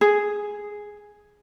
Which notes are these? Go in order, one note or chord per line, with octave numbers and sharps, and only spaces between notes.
G#4